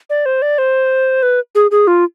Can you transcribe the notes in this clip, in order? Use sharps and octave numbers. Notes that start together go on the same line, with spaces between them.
D5
C5
D5
C5
B4
G#4
G#4
F4